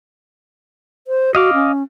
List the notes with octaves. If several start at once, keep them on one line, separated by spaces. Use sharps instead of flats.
C5
F#4 D#5 F5 D6
C#4